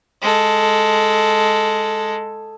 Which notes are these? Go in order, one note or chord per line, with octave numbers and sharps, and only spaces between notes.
G#3 A4